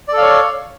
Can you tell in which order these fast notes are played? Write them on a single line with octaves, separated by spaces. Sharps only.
D5 A4 F5 C#5